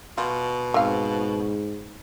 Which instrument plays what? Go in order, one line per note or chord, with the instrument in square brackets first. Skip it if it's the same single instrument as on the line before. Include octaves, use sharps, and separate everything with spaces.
[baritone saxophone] B2 [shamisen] F4
[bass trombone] G#2 [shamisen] C4 F5